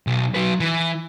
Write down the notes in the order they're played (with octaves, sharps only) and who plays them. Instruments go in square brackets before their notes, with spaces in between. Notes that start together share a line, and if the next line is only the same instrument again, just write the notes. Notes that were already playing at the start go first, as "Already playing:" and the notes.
[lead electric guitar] B1
F#3 B4
E3